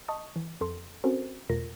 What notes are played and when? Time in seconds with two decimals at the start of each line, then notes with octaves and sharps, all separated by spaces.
0.08 D#5 A5 C#6 D#6
0.36 E3
0.61 F2 A4 C6
1.04 C4 C#4 F#4 A4 A#4 C5
1.49 E2 B2 A3 F4 A#4 A#6